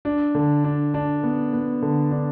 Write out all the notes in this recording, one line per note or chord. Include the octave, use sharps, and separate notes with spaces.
D4
D3
D4
D4
B3
B3
D3
D4